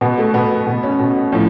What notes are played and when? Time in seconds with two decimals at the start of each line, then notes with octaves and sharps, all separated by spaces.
0.01 B2 B3
0.18 A3
0.34 B2 B3
0.67 B2
0.83 C#4
0.99 B2
1.32 A2 F3